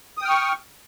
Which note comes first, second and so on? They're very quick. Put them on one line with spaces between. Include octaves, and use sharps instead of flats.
D#6 G5 F6 C#6